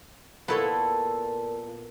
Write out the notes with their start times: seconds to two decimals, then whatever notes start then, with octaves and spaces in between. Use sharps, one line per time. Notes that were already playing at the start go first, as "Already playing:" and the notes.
0.48 A#2 B3 E4 F4 A4 C#5 A5